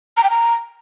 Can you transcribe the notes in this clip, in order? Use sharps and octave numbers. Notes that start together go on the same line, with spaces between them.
A#5
G5
A#5